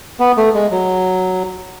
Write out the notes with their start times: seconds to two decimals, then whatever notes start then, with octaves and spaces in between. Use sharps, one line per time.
0.20 B3
0.37 A3
0.54 G#3
0.71 F#3